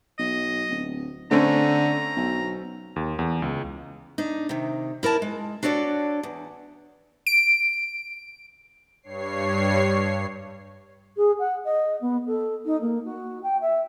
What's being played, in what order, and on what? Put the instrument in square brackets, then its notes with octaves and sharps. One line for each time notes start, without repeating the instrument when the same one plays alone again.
[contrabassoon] B1 [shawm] D#5
[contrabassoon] D1
[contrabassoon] D3 [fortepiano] A3 C4 C#4 [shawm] A#5
[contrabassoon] B1
[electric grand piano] D#2
E2
C#2
[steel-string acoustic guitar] D4 D#4
C3 D#3
E4 A#4 D5 A5
G#3
D4 F#4 A4 C#5 D5
E2
[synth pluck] D7
[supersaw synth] G2 C#5 C7
[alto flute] G#4
F#5
D#5
B3
A4
D#4
A#3
F#4
G5
E5